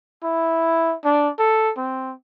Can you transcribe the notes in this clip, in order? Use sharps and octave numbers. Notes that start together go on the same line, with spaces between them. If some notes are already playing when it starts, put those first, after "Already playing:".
E4
D4
A4
C4